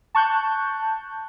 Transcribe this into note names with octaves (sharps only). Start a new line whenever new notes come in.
A5 C#6 F#6 G6